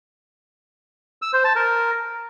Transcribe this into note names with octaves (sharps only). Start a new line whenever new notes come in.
E6
C5
A5
A#4